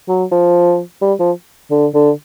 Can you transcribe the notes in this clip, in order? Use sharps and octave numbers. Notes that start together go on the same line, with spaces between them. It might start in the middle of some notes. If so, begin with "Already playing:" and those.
F#3
F3
G3
F3
D3
D3